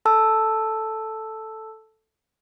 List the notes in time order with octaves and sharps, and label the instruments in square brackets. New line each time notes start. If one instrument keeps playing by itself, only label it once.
[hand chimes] A4 A5 E6